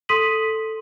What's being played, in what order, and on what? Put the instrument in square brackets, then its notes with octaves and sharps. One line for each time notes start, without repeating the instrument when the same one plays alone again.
[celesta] A4 C6 D#6 B6 D#7 F#7